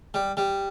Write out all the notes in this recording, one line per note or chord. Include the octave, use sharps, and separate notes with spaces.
G3
G3